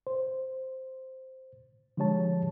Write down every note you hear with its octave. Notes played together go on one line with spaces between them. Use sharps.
C5
D3 F3 G#3 G4 C#5 A5